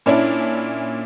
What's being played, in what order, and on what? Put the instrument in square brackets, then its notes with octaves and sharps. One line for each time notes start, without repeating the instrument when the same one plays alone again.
[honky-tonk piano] A#2 C#4 D4 E4